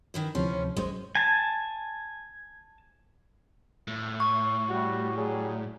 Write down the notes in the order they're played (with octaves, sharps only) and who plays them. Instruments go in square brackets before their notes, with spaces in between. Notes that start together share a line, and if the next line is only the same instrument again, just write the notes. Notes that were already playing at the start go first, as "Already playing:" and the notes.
[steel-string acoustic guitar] D#3 E3 E4
[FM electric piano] D2 C3 E3 [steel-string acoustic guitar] F3 C#4 E4
[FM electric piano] G#1 F#2 C5 [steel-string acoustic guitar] G#3
[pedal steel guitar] G#5 A5
[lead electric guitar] A2
[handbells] C#6
[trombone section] G3 [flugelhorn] F#4
[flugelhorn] F#3 [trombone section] G3 G#4